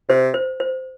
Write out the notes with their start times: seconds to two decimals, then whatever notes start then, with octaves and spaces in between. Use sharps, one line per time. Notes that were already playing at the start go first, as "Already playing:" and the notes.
0.09 C3 C5
0.34 C5
0.60 C5